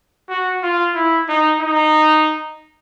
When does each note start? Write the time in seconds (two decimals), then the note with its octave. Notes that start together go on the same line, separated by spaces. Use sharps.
0.29 F#4
0.63 F4
0.94 E4
1.29 D#4
1.61 D#4